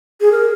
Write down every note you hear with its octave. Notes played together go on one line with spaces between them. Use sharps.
G#4
A#4